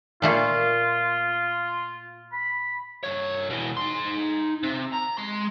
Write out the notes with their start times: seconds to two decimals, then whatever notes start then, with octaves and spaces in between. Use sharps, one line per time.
0.22 A#2 A3 A#3 F4
2.32 B5
3.04 G2 C#5
3.50 B2 E3
3.77 D#4 C6
4.63 C3
4.92 A#5
5.18 G#3 C6